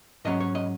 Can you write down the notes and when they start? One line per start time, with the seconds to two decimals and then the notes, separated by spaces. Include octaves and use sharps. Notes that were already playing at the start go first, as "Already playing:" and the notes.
0.25 G#2 F#3 C#4 D#5
0.40 C#5
0.55 D#5